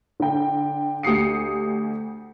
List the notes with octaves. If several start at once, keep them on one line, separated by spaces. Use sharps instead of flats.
D3 G5
D2 G4 D#6 C7 C#7